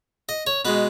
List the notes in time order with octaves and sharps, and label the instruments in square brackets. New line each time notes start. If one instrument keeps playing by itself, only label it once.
[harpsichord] D#5
C#5
B2 G#3 B4